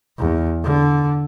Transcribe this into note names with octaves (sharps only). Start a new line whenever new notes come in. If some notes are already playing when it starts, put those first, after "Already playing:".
E2
D3